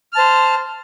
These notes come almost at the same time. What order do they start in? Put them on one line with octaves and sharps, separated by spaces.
F6 A5 C5